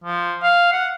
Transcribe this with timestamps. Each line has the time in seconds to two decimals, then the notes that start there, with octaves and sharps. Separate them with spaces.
0.04 F3
0.43 F5
0.72 F#5